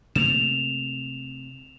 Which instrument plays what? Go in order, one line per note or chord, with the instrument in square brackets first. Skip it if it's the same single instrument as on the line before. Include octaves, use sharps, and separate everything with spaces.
[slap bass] C3 A3 A#3 [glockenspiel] E7 F7